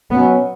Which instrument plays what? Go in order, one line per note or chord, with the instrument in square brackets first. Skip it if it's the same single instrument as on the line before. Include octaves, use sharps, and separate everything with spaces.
[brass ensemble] B2 F#3 C#4 [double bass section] B3